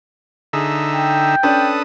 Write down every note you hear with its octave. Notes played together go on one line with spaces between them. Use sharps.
D3 D#4 G#4 E5
G5
C#4 D4 A4 B4 D#6